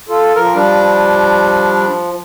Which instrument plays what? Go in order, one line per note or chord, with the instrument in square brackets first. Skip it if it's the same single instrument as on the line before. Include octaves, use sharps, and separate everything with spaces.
[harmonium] F4 A4
[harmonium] F3 [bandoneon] A#4
[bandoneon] G3 D4